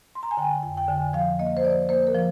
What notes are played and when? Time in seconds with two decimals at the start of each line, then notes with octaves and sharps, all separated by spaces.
0.15 C6
0.23 A#5
0.31 G#5
0.37 D3 G5
0.63 F2 G5
0.77 G5
0.88 D3 G#5
1.13 F3 F5
1.39 A#3 D#5
1.57 C5
1.64 F3 D5
1.89 A#3 C5
2.07 A#4
2.14 F3